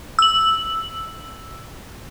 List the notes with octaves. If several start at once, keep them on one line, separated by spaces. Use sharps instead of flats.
E6 F#7